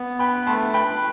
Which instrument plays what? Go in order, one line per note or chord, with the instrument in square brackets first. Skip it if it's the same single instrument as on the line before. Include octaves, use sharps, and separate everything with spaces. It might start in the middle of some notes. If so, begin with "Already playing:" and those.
Already playing: [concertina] B3
[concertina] B4 [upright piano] G5 B5
[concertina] A3 [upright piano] A5 C6
[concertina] B4 [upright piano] G5 B5